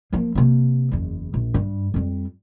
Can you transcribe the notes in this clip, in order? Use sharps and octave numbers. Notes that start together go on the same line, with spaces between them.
F3 A#3
C3 A#3
F#1 E2
A#1
G2
F2 G3